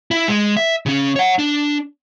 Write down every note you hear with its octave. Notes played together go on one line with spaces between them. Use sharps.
E4
G#3
E5
C#3 C#4
C#5 F#5
D4